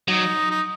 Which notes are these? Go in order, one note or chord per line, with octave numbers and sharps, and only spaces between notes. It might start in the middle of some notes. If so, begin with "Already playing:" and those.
F#3 D#4
D#4